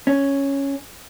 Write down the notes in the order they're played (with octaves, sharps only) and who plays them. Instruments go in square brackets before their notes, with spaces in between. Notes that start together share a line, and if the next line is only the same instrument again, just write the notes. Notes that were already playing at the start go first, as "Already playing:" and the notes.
[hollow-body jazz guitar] C#4